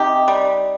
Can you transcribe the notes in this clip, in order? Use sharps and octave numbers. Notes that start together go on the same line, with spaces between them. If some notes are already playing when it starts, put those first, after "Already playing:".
Already playing: C3 D#4 G4
G3